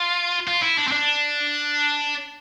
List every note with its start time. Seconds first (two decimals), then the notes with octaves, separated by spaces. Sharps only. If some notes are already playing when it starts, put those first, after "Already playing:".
Already playing: F4
0.47 F4
0.62 E4
0.77 D4
0.88 C4
0.92 D4